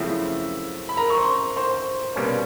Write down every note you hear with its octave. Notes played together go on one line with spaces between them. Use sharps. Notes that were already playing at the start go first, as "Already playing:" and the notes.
Already playing: F#2 C#3 F3 A3 C4 E4 E5
B5
A#4 A#5
C#6
C5 C6
C5 C6
C2 B2 G3 A#3 C#4